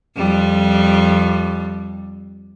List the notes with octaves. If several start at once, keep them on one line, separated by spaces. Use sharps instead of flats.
F2 G3